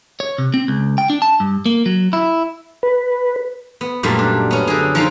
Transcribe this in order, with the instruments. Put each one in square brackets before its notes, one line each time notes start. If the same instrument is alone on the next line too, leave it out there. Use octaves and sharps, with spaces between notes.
[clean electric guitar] C#5
C3
C4
C#2
G5
D4
A5
G2
A#3
F#3
E4
[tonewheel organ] B4
[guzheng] B3
F#2 A#2 G3 A3
D4
B3 C#4
D3 G#4
F3 G3 D#4 C5 F5 G5